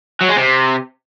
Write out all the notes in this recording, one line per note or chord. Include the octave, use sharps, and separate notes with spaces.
F#3
G#3
C3